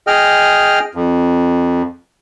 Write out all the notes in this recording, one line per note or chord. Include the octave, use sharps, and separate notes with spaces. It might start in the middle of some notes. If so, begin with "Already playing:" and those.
G#4 D#5 G5 F6
F2